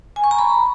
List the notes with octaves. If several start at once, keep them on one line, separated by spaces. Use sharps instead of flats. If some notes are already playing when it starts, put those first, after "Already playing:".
G#5
C#6
A#5
B5